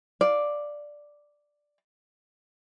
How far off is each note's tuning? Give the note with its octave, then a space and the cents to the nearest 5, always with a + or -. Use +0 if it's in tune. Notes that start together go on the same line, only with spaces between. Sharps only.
D5 +0 F5 +0